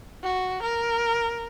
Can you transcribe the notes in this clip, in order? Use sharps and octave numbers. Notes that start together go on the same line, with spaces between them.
F#4
A#4